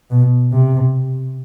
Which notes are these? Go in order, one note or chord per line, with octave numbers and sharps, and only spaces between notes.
B2
C3